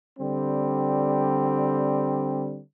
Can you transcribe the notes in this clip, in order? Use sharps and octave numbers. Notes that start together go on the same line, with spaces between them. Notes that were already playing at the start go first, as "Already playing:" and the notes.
D3 G3 C4